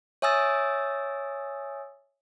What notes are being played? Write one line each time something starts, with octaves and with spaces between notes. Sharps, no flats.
C#5 E5 G#5 D#6 E6 A6